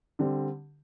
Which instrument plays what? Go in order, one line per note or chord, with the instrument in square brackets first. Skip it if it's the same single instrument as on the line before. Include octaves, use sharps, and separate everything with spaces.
[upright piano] D3 G3 C4